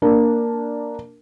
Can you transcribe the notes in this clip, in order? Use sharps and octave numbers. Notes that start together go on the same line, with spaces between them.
A#3 D4